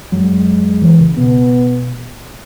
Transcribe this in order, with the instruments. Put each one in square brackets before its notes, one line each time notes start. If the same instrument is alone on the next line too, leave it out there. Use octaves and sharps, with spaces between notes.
[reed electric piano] F#2 F#3 [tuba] G#3
[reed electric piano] E2 E3
C#2 C#3
[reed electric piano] B2 [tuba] B3